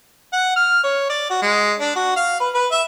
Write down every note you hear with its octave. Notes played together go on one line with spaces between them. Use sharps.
F#5
F6
C#5
D5
F#4
G#3
D4
F#4
F5
B4
B4
E5